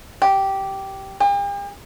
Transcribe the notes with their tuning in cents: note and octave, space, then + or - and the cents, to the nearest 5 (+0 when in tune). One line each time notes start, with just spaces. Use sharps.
G4 -10
G4 +45